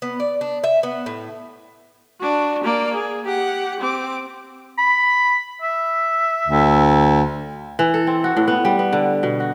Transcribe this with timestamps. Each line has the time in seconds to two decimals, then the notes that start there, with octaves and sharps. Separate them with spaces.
0.02 B3
0.20 D5
0.41 D4
0.64 E5
0.83 B3
1.06 A2
2.20 D4 F#4
2.63 A#3 D5
2.94 G#4
3.24 G4 F#5
3.80 C4 D6
4.78 B5
5.62 E5
6.48 D2
7.79 E3
7.94 A4
8.07 C4
8.24 F#4
8.37 A2
8.48 B3
8.65 G3
8.79 B3
8.93 D3
9.23 B2
9.40 F#4